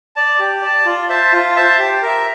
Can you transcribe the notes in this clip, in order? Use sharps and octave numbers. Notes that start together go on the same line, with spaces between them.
D5 A5
G4
D5 A5
F4
C5 E5 A5
F4
C5 E5 A5
G4
A#4 E5